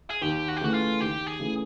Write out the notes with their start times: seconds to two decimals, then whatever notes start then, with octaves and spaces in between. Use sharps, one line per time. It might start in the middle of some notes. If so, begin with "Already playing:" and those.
0.10 G#4
0.22 D#2 G4
0.48 F#4
0.57 G4
0.61 C#3 E3 A3 F#4
0.74 F4
1.00 D#2 G4
1.27 G#4
1.40 C#3 E3 A3